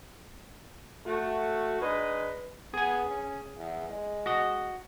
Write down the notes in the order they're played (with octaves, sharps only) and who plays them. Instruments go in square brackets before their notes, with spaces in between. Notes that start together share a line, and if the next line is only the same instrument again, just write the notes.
[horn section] A3 F#4
G#3 D4 D#4 B4
[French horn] B3 [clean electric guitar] G#4 G#5
[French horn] C#4
E2
G#3
[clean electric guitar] F#4 D#5